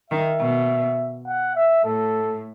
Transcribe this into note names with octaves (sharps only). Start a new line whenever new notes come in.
D#3 E5
B2
F#5
E5
A2 A4